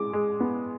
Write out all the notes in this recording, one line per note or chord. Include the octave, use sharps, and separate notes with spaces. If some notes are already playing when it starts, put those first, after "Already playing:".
Already playing: G#3 D6
G#3
B3